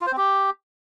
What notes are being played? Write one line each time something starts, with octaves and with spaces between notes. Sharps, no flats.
F4
C5
C4
G4